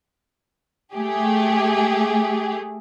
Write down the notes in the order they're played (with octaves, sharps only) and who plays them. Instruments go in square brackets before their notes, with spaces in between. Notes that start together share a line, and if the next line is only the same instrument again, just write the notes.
[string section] A3 G4 G#4